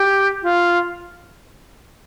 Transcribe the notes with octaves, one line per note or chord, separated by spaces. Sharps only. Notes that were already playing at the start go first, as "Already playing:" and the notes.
Already playing: G4
F4